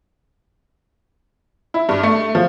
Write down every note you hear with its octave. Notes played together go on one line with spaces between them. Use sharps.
E4
G2
A3
F3